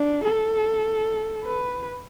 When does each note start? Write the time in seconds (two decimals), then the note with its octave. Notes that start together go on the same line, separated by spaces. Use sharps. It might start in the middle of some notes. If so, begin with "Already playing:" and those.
Already playing: D4
0.24 A4
1.44 B4